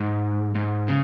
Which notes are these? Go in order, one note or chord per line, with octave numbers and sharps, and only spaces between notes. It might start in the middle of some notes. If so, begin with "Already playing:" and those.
Already playing: G#2
G#2
C#3